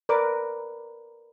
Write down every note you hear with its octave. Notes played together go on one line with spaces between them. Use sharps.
A#4 B4 D5 D6